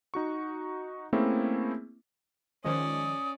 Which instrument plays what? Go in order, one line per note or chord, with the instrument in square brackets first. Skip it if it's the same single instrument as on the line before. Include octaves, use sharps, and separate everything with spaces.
[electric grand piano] D#4 F#4 C#6
A3 A#3 C4 C#4 E4 G#4
[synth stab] D#3 F3 G#3 [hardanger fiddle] C#4 D5 [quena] D#6